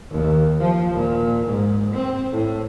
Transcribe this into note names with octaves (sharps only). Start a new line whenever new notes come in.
D#2
F3
A#2
G#2
C4
A2